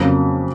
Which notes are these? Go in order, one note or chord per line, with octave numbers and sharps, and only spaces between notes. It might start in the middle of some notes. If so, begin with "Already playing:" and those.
Already playing: F2 C#3 F#3 A#3